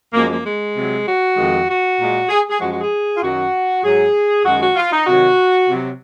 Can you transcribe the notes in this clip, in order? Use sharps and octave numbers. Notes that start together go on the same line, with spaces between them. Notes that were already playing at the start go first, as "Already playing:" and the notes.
F#2 F3 G#3 A#3
A#3
G#3
C3 F#3
F#4
F2 D#3 G#3
F#4
A#2 G#3
G#4
G#4
F#2 F3 G#3 F#4
F#4
G#4
F4
F#2 D#3 F#3 F#4
G#2 F#3 G#4
F#2 D#3 G#3 F#4
F#4
F4
D#4
C3 D#3 F#3 F#4
C3 F#3